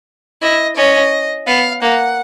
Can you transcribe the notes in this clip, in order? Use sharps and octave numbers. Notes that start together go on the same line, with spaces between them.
E4 D#5
C#4 D#5
B3 F5
A#3 F#5